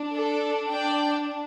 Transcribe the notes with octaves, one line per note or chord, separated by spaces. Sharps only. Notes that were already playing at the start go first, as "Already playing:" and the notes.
Already playing: D4
A4 D5
D5 G5